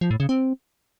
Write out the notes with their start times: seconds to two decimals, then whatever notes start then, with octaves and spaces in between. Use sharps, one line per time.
0.01 F3
0.11 A2
0.20 C#3
0.29 C4